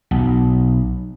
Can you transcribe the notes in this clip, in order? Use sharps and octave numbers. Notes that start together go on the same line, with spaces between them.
B1